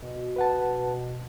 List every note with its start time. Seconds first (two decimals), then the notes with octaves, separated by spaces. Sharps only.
0.02 B2
0.36 B4 F#5 A5